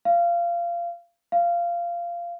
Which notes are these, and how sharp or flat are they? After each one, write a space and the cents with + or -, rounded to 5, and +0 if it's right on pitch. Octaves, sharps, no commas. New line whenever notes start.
F5 -20
F5 -15